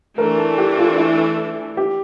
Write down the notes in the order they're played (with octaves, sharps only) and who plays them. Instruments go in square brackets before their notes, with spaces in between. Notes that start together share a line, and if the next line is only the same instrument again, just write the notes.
[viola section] E3 A3 D4 [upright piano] A#4
[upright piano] A4
G4
F4
E4
G4